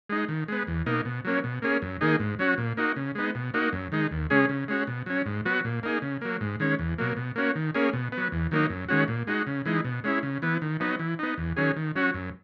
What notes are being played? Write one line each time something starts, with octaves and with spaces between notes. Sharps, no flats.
G#3 D#4
D#3
G#3 B3
E2
B2 A#3 D#4
B2
F#3 A#3 C#4
B2
A#3 C#4 G#4
F#2
D#3 A#3 D#4 G#4
G#2
F#3 C#4 F#4
A#2
A#3 D#4 F#4
C#3
G#3 B3 D#4
B2
A#3 D#4 F#4
F#2
D#3 G#3 D#4
D#2
C#3 G#3 C#4 G#4
C#3
G#3 C#4 F#4
B2
F#3 C#4
G#2
F#3 B3 F#4
A#2
A#3 D#4 G#4
C#3
F#3 A#3
G#2
D#3 G#3 C#4
E2
B2 F#3 A#3
B2
A#3 C#4 F#4
D#3
A#3 C#4 G#4
B2
F#3 B3
E2
D#3 F#3 A#3 D#4
F#2
D#3 G#3 C#4 F#4
A#2
G#3 D#4 F#4
C#3
E3 G#3 D#4
B2
G#3 C#4 E4
C#3
E3 B3
D#3
F#3 B3 D#4
E3
B3 D#4
E2
D#3 F#3 C#4 G#4
D#3
F#3 C#4 F#4
F#2